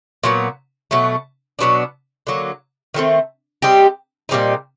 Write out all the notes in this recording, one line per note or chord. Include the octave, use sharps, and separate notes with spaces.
A#2 F#3 B3
B2 F#3 A3
B2 F#3 B3 D4
D3 F#3 A#3
D#3 F#3 A3 C4
G3 C4 D#4 G4
A#2 G3 C4 D#4